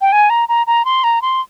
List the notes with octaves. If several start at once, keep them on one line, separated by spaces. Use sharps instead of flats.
G5
G#5
A#5
A#5
A#5
C6
A#5
C6